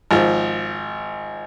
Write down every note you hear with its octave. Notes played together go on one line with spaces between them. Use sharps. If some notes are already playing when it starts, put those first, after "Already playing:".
G#1 F3